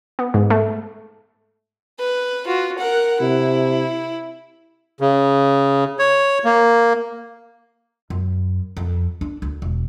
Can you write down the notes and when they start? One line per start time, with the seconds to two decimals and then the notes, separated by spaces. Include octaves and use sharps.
0.19 B3
0.34 G#2
0.50 A3
1.99 B4
2.46 F4 F#4
2.79 A#4 F#5
3.20 C3 E4
5.01 C#3
5.99 C#5
6.45 A#3
8.10 F#2
8.77 F2
9.21 D4
9.42 D2
9.62 E1